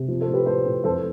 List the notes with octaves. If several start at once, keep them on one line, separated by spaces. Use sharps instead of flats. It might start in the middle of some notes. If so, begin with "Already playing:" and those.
Already playing: C3
F3
A4 C5
A2
G4 B4
A2 A4 C5
A2
F2 A4 C5